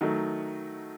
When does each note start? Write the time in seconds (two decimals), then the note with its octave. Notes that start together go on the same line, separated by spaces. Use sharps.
0.01 D#3 F#3 A3 D#4 F#4